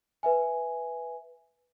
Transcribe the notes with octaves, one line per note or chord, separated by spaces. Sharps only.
B4 E5 G#5